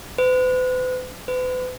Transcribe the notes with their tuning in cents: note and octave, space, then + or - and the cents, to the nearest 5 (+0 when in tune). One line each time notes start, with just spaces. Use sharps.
B4 +45
B4 +40